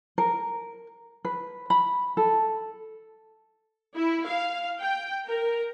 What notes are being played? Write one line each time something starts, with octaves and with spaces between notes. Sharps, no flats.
A#4
B4
B5
A4
E4
F5
G5
A#4